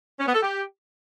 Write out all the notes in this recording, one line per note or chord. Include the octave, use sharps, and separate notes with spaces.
C#4
B3
A4
G4